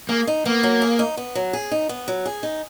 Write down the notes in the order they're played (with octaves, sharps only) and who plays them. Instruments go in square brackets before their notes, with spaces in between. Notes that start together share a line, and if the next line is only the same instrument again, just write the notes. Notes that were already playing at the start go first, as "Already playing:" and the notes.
[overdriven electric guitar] A#3 [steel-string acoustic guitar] G#4
[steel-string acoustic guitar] D#4
[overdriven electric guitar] A#3 [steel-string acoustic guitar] B3
[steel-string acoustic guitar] F#3
G#4
D#4
B3
F#3
G#4
D#4
B3
F#3
G#4
D#4